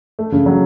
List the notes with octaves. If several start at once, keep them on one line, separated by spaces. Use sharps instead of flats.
A3
C#3
F#3